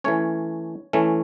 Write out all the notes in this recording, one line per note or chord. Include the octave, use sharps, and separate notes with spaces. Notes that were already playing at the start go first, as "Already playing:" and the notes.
E3 A3 C#4 C#5
E3 A3 C#4